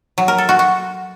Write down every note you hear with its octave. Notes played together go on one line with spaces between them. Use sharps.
F#3
A#4
A4
F#4
F#4